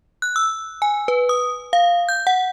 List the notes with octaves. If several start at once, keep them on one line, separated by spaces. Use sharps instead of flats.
F#6
E6
G#5
B4
D#6
F5
G6
F#5